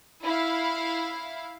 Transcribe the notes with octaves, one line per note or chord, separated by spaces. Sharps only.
E4 F5